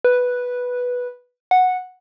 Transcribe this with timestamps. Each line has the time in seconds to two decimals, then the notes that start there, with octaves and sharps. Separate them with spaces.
0.04 B4
1.51 F#5